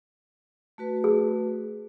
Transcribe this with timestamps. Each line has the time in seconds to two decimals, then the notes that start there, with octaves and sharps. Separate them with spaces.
0.78 A3 F#4 B4
1.04 G#4